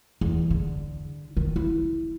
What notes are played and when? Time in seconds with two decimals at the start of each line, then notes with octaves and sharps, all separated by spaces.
0.21 E2
0.50 D3
1.37 D#3
1.56 E4